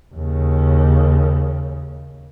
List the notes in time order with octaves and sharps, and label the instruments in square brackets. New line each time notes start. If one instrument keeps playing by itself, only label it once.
[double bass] D#2 C#3